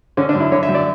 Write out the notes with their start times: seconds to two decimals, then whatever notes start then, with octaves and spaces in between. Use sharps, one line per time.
0.17 D3 C#4
0.29 D4
0.34 F#2
0.40 E4
0.52 D3 C#5
0.63 E5
0.68 F#2
0.75 D5